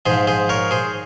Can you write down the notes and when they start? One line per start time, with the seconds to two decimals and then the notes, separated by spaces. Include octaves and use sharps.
0.06 G#2 F3 G#4 C5
0.27 G#4 C5
0.49 A#4 C#5
0.71 G#4 C5